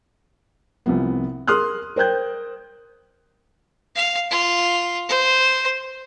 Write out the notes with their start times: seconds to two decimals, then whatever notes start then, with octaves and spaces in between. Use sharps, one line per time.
0.86 C2 C3 F3 B3
1.47 G#4 A#4 C6 D#6 F6 F#6
1.96 A#4 C5 G5 F#6 G6
3.95 F5
4.31 F4
5.09 C5